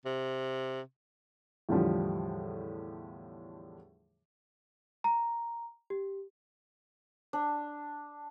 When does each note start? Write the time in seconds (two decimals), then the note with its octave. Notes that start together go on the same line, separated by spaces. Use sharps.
0.06 C3
1.69 E2 A2 D3 F3 G3
5.04 A#5
5.90 G4
7.33 D4